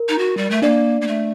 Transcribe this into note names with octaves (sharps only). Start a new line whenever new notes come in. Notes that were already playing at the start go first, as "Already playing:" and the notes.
Already playing: A#4
D#4
F#4
G3
A3
A#3 D4 D5
A#3
A3